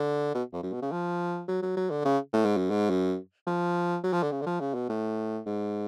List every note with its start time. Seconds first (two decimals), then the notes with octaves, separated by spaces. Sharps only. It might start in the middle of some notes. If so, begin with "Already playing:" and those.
Already playing: D3
0.34 B2
0.53 F2
0.63 F#2
0.72 B2
0.82 C#3
0.91 F3
1.48 F#3
1.62 F#3
1.76 F#3
1.90 D3
2.05 C#3
2.33 A2
2.45 G#2
2.57 F#2
2.70 G#2
2.90 F#2
3.46 F3
4.03 F#3
4.13 F3
4.23 D3
4.32 C#3
4.41 D3
4.46 F3
4.60 C#3
4.74 B2
4.89 A2
5.46 G#2